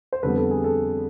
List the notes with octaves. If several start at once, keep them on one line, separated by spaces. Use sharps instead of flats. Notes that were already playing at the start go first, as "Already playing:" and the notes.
C5
F2 D3 G3 B3 A4 B4
A4
G#4
A4